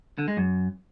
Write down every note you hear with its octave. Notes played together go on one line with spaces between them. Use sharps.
D3
G#3
F#2